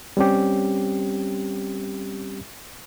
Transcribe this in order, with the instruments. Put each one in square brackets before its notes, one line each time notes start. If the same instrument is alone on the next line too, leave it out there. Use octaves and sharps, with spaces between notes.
[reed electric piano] G3 C4 C#4 G4